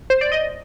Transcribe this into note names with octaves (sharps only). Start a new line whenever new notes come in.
C5
D5
D#5